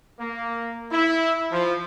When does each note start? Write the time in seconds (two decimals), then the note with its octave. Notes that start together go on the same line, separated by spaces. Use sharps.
0.19 A#3
0.92 E4
1.52 F3